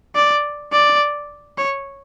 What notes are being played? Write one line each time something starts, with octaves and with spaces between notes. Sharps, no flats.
D5
D5
C#5